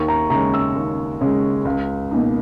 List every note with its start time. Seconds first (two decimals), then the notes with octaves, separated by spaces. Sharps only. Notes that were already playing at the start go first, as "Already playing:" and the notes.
Already playing: D#2 C#6
0.08 A#5
0.30 C#3 G#3 C#4 A#5
0.54 E6
0.75 D#2
1.21 C#3 G#3 C#4
1.65 C#2
2.11 B2 A#3 D#4